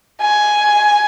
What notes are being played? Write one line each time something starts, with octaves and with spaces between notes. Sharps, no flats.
G#5